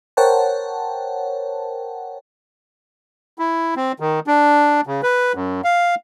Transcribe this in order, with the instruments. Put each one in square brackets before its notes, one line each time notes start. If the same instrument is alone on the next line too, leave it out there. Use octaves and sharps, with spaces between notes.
[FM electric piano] A#4 C5 C#5 F#5 G5 A5
[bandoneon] E4
C4
D#3
D4
C#3
B4
F#2
F5